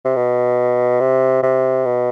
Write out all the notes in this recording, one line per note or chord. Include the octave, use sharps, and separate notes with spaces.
C3
B2
C3
C3
B2